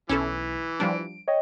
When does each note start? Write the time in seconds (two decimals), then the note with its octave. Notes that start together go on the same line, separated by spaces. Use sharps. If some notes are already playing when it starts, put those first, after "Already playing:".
0.09 B1 E3 C#4 E4 A4
0.80 F3 G3 D4 D7
1.28 C#5 D#5 G5